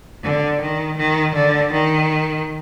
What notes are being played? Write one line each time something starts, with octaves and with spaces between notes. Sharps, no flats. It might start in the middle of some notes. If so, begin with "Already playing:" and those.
D3
D#3
D#3
D3
D#3